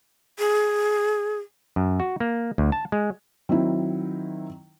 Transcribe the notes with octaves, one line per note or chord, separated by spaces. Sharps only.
G#4
F#2
F#4
A#3
D2
A5
G#3
D#3 F#3 C4 E4